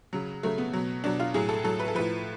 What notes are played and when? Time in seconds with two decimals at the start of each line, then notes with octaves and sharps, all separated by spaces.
0.13 C#3 F#3
0.43 C#3 F#3 A3
0.58 B3
0.73 B2 F#3
1.04 B2 F#3 D4
1.19 F4
1.34 A2 F#3 G#4
1.49 A4
1.64 A2 F#3 A4
1.80 B4
1.88 A4
1.95 A2 F3 B4